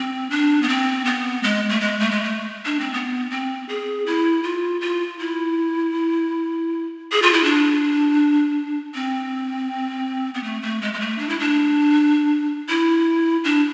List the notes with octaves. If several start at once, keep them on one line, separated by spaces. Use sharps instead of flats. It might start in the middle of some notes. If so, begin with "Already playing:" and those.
Already playing: C4
D4
B3
C4
B3
G#3
A3
G#3
A3
G#3
A3
D4
C4
B3
C4
G#4
E4
F4
F4
E4
G#4
F4
E4
D4
C4
B3
A3
A3
G#3
G#3
A3
D4
E4
D4
E4
D4